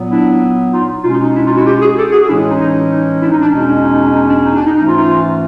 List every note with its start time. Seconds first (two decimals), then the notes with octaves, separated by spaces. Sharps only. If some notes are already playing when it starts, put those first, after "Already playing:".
Already playing: A#2 F#3 B3
0.10 D4 E4
0.73 D#4 F4
1.03 B2 G#3 C#4 D#4 F4
1.14 D#4
1.24 D#4
1.35 D4 E4
1.45 D#4 F4
1.55 E4 F#4
1.66 F4 G4
1.81 F#4 G#4
1.97 G4 A4
2.12 F#4 G#4
2.28 A2 E3 G#3 C#4 D4 E4
2.48 D#4
2.59 D#4
2.90 D#4
3.21 D4 E4
3.32 D#4
3.41 D4
3.52 E2 B2 G#3 C#4 D#4
3.68 D4
3.83 D#4
3.94 D#4
4.03 D4
4.14 D#4
4.29 D4
4.45 D#4
4.56 D4
4.66 D#4
4.76 G#2 E3 A3 C#4 D#4
4.87 D#4 F4
4.97 D#4 F4